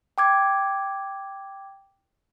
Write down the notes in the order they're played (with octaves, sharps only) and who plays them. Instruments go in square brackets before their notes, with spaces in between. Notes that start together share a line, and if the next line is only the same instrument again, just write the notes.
[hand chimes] G5 D6 G#6